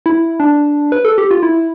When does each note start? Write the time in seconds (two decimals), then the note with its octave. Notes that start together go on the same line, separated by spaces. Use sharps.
0.06 E4
0.40 D4
0.92 B4
1.05 A4
1.18 G4
1.31 F4
1.43 E4